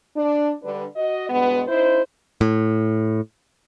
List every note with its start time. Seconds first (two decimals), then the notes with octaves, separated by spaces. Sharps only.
0.16 D4
0.63 D3 G3 D4 B4
0.96 F#4 D#5
1.30 G2 B2 G#3 B3
1.68 C#4 D#4 E4 C5
2.41 A2